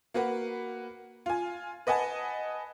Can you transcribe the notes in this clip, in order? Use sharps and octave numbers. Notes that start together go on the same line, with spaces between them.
A#3 F#4 B4 F#5
F4 G#5
B4 D#5 F#5 G#5 A5